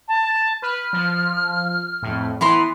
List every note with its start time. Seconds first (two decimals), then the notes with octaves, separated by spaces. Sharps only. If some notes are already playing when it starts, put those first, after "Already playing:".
0.08 A5
0.62 B4 F6
0.93 F3
2.02 F2 A2
2.41 E3 B3 E4 A#5 C6